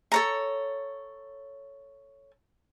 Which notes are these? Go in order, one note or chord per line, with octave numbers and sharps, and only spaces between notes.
A4 C#5 A#5